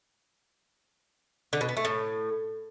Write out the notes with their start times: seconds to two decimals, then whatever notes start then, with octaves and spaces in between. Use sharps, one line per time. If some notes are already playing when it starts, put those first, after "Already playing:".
1.53 D3
1.61 B2
1.69 B3
1.77 A3
1.85 A2